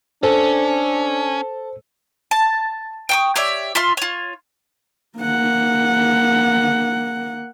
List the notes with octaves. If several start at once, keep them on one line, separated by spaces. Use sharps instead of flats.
C#4 D4 A4 C5
A5
G5 C#6 D#6
G4 C#5 D5 E5
F4 E5 C6 F6
F4 C#5
A#3 F#5